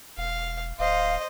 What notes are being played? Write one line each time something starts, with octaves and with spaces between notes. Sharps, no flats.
E1 F5
D1 C5 D#5 F5